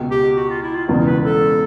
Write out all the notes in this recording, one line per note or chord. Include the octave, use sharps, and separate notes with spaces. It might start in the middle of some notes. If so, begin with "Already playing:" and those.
Already playing: C#2 B2 G#3
G4
F#4
F4
E4
F4
E1 E2 C#3 E3
B4
A4